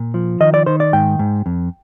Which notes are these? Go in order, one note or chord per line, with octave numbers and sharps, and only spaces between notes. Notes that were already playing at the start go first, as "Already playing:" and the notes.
Already playing: A#2
F3
D#3 D#5
D5
D#3 C5
D5
G#2 G5
G#2
F2